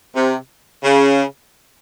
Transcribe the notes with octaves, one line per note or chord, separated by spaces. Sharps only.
C3
C#3